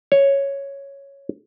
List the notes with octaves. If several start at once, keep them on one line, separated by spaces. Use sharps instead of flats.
C#5